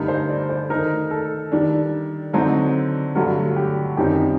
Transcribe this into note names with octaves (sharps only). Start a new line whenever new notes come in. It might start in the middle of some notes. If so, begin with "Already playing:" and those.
Already playing: G2 D3 A3 D#4 A#4
C5
D5
C5
D#3 A3 D#4 A#4
A4
D#3 G3 D4
D3 F#3 C4 D#4
G2 D3 F#3 A3 F#4
G4
F#2 D#3 G3 C4 D#4 G4